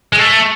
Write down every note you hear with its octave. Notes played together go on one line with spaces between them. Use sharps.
G#3
A3